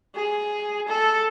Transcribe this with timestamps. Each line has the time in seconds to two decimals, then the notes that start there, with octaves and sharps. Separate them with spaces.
0.15 G#4
0.88 A4